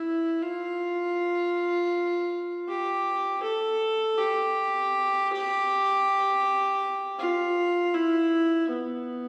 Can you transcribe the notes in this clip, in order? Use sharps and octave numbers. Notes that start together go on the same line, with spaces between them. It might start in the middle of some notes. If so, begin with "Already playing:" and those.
Already playing: E4
F4
G4
A4
G4
F4
E4
B3